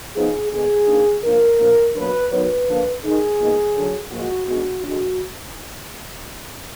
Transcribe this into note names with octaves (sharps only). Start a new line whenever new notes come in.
F3 B3 D#4 G#4
D3 G#3 B3 D4 G#4
D#3 A#3 D4
F3 A#3 D4 A#4
A#2 F3 A#3 D4
B2 F#3 A#3 D4 B4
D#3 F#3 B3 D#4 B4
D3 F3 A#3 D4
D#3 G#3 D#4 G#4
A#2 G#3 B3 D#4
D3 F#3 D4
A#2 F3 G#3 F#4
B2 G#3 D4 F#4
D3 G#3 D4 F#4